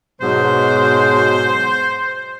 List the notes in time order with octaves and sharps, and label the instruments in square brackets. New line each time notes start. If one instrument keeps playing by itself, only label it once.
[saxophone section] G#2 B2 F#3 [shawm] C5